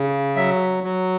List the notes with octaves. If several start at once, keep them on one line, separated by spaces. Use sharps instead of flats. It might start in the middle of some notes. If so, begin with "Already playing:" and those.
Already playing: C#3
F#3 E5
F#3